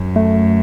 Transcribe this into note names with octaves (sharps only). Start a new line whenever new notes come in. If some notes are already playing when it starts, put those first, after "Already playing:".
Already playing: F#2
A3